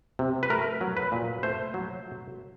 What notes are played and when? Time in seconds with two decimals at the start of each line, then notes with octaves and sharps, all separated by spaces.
0.19 C3
0.43 B4
0.50 A3 A#4
0.81 F#3
0.97 B4
1.12 A#2
1.43 A3 C5
1.74 F#3